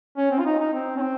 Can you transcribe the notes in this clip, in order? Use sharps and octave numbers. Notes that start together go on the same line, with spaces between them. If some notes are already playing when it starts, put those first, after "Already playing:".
C#4
C4
F4
D#4
D#4
C4
C#4
C4